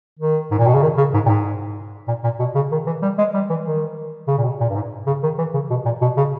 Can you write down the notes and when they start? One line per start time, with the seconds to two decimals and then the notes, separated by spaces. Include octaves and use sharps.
0.19 D#3
0.51 G#2
0.58 A#2
0.67 B2
0.75 C#3
0.82 D#3
0.97 C#3
1.14 G#2
1.26 A#2
1.29 G#2
2.08 A#2
2.24 A#2
2.39 B2
2.55 C#3
2.72 D#3
2.87 E3
3.02 G3
3.18 G#3
3.34 G3
3.50 E3
3.66 D#3
4.28 C#3
4.38 A#2
4.44 B2
4.60 A#2
4.70 G2
4.75 G#2
5.07 C#3
5.23 D#3
5.38 E3
5.54 C#3
5.70 B2
5.86 A#2
6.02 B2
6.17 C#3